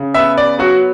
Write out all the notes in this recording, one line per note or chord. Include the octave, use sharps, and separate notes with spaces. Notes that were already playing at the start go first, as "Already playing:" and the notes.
Already playing: C#3
B3 E5
D5
F#3 F#4